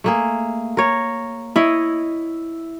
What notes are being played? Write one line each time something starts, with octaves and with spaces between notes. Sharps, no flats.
A3 A#3 G#4
A#4 C#5
E4 C#5 D#5